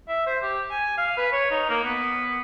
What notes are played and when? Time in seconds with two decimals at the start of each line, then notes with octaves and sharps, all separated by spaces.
0.08 E5
0.27 C5
0.42 G4
0.70 G#5
0.98 F5
1.17 B4
1.32 C#5
1.51 D#4
1.69 A#3
1.83 B3